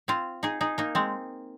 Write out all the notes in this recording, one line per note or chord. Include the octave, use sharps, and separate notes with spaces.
C4 F4
D#4 G#4
D#4 G#4
A#3 D#4
G#3 C4